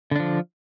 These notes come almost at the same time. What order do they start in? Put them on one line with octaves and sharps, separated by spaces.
D3 D4 F3